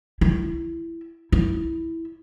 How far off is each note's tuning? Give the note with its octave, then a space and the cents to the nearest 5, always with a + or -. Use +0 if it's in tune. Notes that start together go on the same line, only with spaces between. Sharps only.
E4 +15
E4 -5